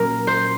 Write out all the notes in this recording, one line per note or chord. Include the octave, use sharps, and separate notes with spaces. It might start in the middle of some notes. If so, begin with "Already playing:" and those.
Already playing: A#2 F#3 A#3 C#4 A#4
C5